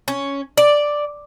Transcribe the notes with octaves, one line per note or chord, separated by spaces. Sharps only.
C#4
D5